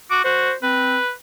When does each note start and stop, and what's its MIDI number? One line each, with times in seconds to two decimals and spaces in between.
0.11 0.19 66
0.11 0.25 86
0.25 0.50 66
0.25 0.55 72
0.63 0.98 60
0.63 1.10 71